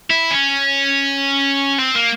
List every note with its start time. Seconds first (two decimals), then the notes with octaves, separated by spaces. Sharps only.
0.10 E4
0.31 C#4
1.79 C4
1.95 A#3